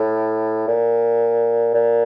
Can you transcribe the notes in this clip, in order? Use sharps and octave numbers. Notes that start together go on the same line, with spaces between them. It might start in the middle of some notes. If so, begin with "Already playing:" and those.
Already playing: A2
A#2
A#2